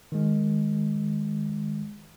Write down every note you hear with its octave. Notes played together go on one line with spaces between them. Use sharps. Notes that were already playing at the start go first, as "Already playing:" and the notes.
D#3 G#3